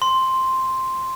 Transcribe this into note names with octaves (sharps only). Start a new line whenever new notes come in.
C6